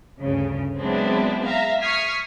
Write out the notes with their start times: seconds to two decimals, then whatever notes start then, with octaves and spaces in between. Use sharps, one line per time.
0.22 D2 G2 C#3
0.79 F#3 G#3 B3 C4 D4 E4
1.45 E5 F5 A#5
1.81 C#6 D#6 F6 G#6 B6 C7